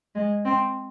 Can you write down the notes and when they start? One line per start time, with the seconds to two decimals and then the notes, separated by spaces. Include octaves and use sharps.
0.15 G#3
0.45 C4